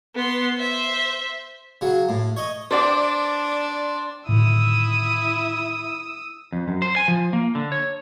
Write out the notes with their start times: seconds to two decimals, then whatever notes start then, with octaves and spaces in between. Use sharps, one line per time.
0.15 B3 C6
0.58 C5 E5
1.81 C#3 F#3
2.09 A2
2.37 C#5 D#5
2.71 D4 C5 D5 G5
4.29 A2 D3 D#3 E4 D#6 E6
6.52 F2
6.68 F#2
6.82 C5
6.96 G#5
7.08 F3
7.33 A#3
7.55 D3
7.72 C#5